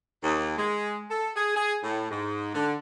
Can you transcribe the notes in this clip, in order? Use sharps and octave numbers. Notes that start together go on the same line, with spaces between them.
D#2
G#3
A4
G#4
G#4
A2
G#2
D3